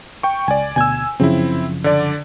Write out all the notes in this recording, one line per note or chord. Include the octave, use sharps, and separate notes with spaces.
G5 C#6
C#2 D5 G#5
D2 B2 G#5 E6 G#6
F#2 C#3 F3 C4 E4
D3 D5